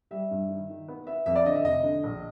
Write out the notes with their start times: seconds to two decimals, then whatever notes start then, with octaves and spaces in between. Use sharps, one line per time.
0.11 G3 E5
0.31 G2
0.49 D#3
0.69 D#3
0.88 B3
1.07 B3 E5
1.26 F2 E5
1.36 D5
1.45 D3 D#5
1.55 E5
1.64 F1 D#5
1.83 D3
2.03 A#1